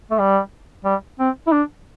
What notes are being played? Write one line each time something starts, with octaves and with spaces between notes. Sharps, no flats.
A3
G3
G3
C4
E4
D4